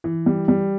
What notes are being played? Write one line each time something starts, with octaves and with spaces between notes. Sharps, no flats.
E3
G3
G3